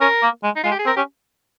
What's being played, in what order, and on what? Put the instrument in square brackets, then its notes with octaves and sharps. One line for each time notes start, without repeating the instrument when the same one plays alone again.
[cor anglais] C#4 [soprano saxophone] A#4
[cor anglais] A#3
G#3
[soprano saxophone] D#4
[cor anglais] G#3 [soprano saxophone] F4
[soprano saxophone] G4
G#4
[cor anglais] C4 [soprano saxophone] A#4
[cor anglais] C#4 [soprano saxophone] G4